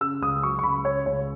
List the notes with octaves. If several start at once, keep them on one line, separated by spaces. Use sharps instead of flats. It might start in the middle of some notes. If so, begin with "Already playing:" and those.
C#3 E6
C#2 D#6
F#3 C#6
C#6
C#2 B5
C#3 C#5
C#2 C#5